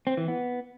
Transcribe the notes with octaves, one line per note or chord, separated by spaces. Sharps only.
C4
E3
B3